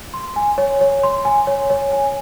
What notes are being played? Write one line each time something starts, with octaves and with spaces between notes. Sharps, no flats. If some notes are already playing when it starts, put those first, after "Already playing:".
C6
G#5
C#5
C#5
C6
G#5
C#5
C#5
G#5